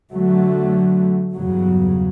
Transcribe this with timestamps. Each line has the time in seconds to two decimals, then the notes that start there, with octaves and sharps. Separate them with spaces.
0.11 D3 F#3 A3
1.34 E2 G2 C#3 F#3